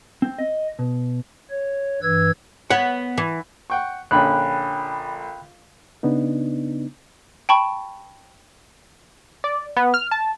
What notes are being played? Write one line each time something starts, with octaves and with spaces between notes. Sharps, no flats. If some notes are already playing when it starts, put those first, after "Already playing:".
C4
D#5
B2
C#5
G2 E3 B4 E6 G#6
B3 C#5 F#5
E3
F#5 G5 C#6
A#1 D3 C#4 G5 B5 F#6
C#3 B3 D4 D#4
G5 A5 B5 C#6
D5
B3
F6
A5